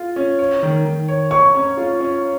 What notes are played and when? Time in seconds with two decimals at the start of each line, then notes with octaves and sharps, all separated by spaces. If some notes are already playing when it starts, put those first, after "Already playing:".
Already playing: F4
0.16 C#4
0.39 C#5
0.63 D#3
0.85 D#3
1.08 C#5
1.31 C#5 C#6
1.55 C#4
1.77 F4
2.00 C#4